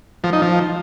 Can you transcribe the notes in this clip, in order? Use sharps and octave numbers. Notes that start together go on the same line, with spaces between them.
F3
D#4
F3